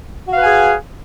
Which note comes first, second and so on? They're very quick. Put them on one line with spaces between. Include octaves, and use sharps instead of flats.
F#4 F5 B4 G#5 G#4